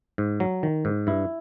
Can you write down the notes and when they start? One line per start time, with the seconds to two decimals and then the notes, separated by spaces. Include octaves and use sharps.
0.18 G#2
0.40 F#3
0.63 D#3
0.85 G#2
1.07 G2 E4